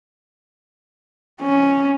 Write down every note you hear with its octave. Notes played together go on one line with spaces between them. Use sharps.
C#4